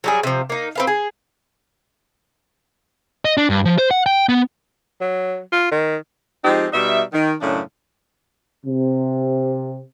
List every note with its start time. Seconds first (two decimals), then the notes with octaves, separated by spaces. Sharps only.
0.04 F#3 G3 G#4
0.23 C3 F3
0.50 A#3 D#4
0.75 C4 B4 F5
0.87 G#4
3.25 D#5
3.37 D4
3.50 G2
3.65 F3
3.78 C5
3.91 F#5
4.06 G5
4.29 B3
5.01 F#3
5.53 F4
5.72 D#3
6.45 F3 G#3 C4 D#4 G4
6.73 B2 G3 D#4 E5
7.14 D#3
7.41 F#2 A2 C#3 D4
8.66 C3